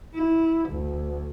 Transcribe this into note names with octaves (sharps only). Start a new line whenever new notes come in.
E4
D2